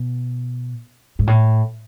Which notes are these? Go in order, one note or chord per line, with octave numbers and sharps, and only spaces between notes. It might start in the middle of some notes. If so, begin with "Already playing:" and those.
Already playing: B2
G#2
A2